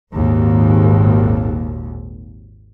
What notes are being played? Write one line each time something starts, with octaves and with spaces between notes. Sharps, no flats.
G#1 D#2 A#2